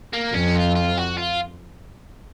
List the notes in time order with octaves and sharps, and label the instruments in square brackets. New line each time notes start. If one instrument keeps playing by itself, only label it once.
[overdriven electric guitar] A#3
[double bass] F2 [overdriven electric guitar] C#4
[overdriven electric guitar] F4
F4
F#4
F4